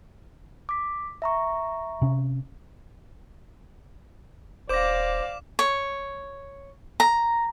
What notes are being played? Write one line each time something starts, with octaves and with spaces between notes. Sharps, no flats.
D6 B6
E5 A#5 C#6
C3 C#4
D#1 C5 D5 F5 D6 A#6 E7
C#5
A#5